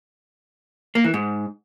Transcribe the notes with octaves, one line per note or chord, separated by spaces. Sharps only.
A#3
E3
G#2